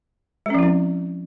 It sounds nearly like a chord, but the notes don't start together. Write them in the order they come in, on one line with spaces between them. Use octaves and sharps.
G#3 C#4 F3 E4 C4